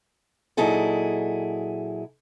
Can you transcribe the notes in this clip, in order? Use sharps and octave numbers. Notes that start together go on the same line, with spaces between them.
A#2 F#3 D#4 E4 G#4 A4